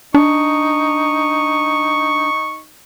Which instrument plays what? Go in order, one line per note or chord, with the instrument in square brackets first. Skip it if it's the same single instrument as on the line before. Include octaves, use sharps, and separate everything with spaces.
[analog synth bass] D4 [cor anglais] D#4 [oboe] C#6